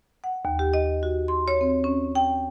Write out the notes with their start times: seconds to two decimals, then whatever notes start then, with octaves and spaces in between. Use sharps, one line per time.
0.24 F#5
0.45 D#2
0.59 G4
0.74 D#5
1.03 F#4
1.28 C6
1.48 C#5
1.61 C4
1.84 C#4
2.15 G5